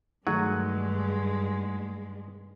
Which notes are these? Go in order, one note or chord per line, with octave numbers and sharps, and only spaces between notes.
G2 D#3 F#3 G#3 A3 D#4 G#4 F#5